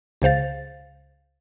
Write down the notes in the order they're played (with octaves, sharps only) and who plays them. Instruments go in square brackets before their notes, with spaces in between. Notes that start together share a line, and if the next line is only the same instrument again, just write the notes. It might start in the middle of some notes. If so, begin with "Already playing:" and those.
[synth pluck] C#2 C#3 C5 F5 A6